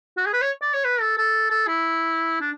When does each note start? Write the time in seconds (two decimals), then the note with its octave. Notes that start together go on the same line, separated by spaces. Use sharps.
0.17 F#4
0.26 G#4
0.33 B4
0.41 C#5
0.62 D5
0.73 C#5
0.84 B4
1.00 A4
1.18 A4
1.50 A4
1.67 E4
2.41 D4